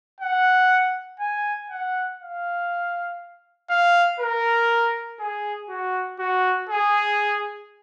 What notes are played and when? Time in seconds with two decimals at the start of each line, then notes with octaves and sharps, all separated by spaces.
0.20 F#5
1.20 G#5
1.70 F#5
2.20 F5
3.70 F5
4.20 A#4
5.20 G#4
5.69 F#4
6.19 F#4
6.69 G#4